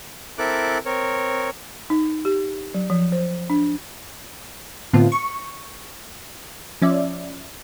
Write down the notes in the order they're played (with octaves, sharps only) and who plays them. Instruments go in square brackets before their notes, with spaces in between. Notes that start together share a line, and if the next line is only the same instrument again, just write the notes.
[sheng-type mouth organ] C4 E4 A4 A#4 D6 F#6
C4 A#4 C#5
[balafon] D#4
G4
F#3
F3
C5
D4
[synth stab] A2 D3 B3 C4 F4
C#6
F3 C#4 D5 E5